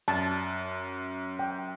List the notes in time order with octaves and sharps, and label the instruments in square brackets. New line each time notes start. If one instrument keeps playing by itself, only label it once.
[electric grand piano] F#2 [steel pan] A5
[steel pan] G5